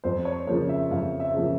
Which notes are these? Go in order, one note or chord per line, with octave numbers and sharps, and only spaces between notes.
F2 C5
C#5
C#3 F3 A#3 C#5
E5
F2 F5
E5
C#3 F3 A#3